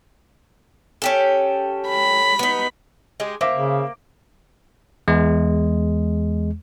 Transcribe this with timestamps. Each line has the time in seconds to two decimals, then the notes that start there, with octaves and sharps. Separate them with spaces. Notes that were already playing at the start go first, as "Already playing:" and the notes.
1.02 C#4 G4 A4
1.89 B5
2.39 B3 D#4
3.20 G#3 G4 G#4
3.41 A#3 C5 E5 D6
3.53 C#3
5.08 E2 G#3